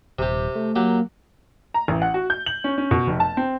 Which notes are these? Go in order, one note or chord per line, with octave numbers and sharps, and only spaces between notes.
D#1 C3 G4
D#1
A3
F#3 A#3 G4
A#5
A1
F#5
F#4
G6
F#7
C#4
C#4
B2
F1
A5
C4